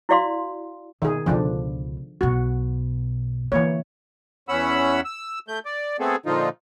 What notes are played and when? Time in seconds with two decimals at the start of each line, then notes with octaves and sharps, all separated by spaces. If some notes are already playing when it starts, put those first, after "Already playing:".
0.09 E4 F#4 D5 F5 C6
1.02 B2 D#3 G#4
1.26 C#2 B2 D3 F3 D4
2.21 B1 B2 F#4
3.52 D3 E3 A#3 C#5
4.49 E2 C#4 F#5 B5 E6
5.05 E6
5.48 A3 G6
5.66 D5
6.00 A3 B3 C4 G#4 A4
6.26 A#2 D3 F3 D#4 F4